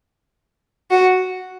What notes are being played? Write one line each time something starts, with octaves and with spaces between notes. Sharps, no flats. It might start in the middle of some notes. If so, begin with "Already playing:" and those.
F#4